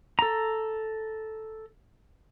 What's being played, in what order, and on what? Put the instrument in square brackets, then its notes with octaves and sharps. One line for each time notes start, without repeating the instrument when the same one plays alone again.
[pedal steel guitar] A4 A#5